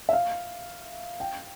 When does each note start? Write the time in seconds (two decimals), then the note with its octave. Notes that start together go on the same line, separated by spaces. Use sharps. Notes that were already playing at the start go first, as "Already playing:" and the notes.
0.09 E5
0.13 F5
1.20 G5